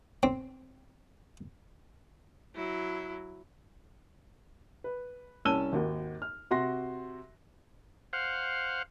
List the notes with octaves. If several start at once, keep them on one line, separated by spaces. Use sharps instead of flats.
C4
F#3 E4
B4
C2 C#4 A5 E6 D#7 G7
G#1 D#2 F#4
F6
C3 F#4 F#5 C6 A#6
C5 F5 F#5